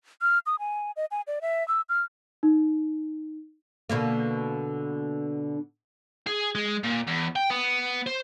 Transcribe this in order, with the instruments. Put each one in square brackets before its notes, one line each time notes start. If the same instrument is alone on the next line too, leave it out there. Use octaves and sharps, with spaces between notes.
[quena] F6
D#6
G#5
D#5
G#5
D5
E5
E6
F6
[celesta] D#4
[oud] B2 D3 A#3
[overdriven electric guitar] G#4
G#3
A#2
E2
G5
B3
C5